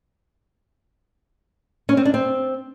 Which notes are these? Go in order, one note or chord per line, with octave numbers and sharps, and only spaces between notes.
C#4
C4
D4
C4